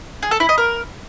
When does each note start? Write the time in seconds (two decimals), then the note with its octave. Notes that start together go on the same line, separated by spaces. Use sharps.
0.23 G#4
0.31 A4
0.40 E4
0.49 D#5
0.58 A#4